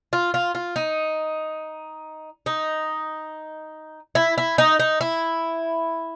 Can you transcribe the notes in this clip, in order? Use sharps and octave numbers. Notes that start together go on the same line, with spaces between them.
F4
F4
F4
D#4
D#4
E4
E4
D#4
D#4
E4